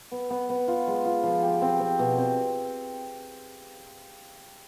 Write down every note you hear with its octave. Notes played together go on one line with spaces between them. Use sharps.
B3
B3
B3
F4
G#3
F4
F3
G4
C4
C4
B2
C4